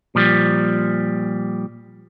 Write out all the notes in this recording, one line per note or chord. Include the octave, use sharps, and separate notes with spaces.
A#2 F3 G3